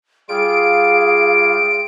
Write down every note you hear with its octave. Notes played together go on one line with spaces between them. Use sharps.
G3 F4 G#4 F5 D7